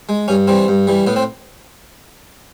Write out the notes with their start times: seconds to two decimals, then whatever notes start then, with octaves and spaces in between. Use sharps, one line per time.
0.09 G#3
0.28 G2 C#4
0.47 E3 G3 C4
0.68 G2
0.87 E3 G3
1.07 A2 B3
1.16 C4